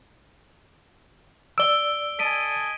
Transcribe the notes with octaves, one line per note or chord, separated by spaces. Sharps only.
D5 E6 D7 G7
A4 D#5 G#5 B6 D7 D#7